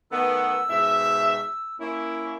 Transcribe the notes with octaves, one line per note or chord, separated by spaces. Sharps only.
D#3 A3 B3 E6
G#2 B2 E5
A#3 C#4 E4